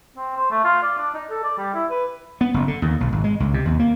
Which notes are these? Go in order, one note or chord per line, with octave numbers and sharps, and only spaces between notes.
C4
C5
A3
F4
D5
D4
D#4
A4
D5
G3
E4
B4
B3
F#1
D3
D#2
B1
G#1
G#3
C#2
C3
D#2
A#3